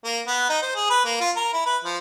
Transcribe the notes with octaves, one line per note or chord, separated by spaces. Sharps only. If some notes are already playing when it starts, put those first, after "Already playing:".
A#3
B3
D#4
C5
G#4
B4
A#3
F4
A#4
E4
B4
F3